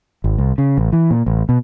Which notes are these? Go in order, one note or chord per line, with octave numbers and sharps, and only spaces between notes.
G#1
C2
C#3
A1
E3
A#2
A1
B2